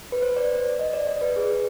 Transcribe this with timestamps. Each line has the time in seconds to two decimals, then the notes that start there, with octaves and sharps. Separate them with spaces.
0.12 B4
0.22 C5
0.36 D5
0.79 D#5
0.93 D5
1.07 D5
1.21 B4
1.36 G#4